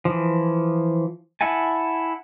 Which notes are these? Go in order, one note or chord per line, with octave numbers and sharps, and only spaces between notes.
E3 F3
E4 F#5 G#5 A5